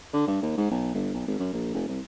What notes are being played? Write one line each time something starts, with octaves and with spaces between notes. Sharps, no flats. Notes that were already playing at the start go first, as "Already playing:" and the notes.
D3
G2
D#2
G#2
B1
G1
B1
G#1
F#2
A#1
F1
C2